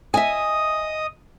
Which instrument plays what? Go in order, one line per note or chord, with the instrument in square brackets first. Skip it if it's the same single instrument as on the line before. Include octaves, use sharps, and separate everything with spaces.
[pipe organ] D#5 D#6 [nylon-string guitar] E5 G#5